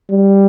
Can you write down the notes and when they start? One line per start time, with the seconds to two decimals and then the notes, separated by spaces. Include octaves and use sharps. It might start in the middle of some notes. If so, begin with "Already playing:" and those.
0.10 G3